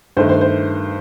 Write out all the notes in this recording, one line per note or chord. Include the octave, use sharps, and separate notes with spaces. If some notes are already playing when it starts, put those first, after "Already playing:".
G2 D#3 A3 C5
C5
C5